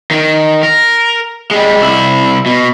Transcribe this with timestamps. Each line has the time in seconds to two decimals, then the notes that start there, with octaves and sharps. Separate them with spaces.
0.11 D#3
0.63 A#4
1.51 G3 G#3
1.81 C2 E4
2.46 B2